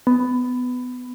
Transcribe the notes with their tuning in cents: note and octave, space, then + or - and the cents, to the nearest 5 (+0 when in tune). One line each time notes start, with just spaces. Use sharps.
B3 +15